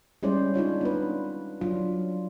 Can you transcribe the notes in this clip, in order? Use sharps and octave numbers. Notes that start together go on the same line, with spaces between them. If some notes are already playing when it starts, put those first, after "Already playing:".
G3 G#3 C#4 E4 C5 D5
D4 D#4 F4 C#5
B3 B4
F#3 D4 F4